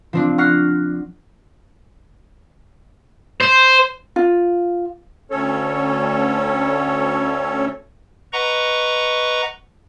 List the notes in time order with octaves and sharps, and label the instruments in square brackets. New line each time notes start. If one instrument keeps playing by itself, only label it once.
[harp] F3 C4 D4
F#5 C#6 F6 F#6 A#6 C7
[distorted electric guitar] C5
[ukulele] F4
[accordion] D2 C#4 A4 C#5
[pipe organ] B4 D#5 F#5 A#5 C#6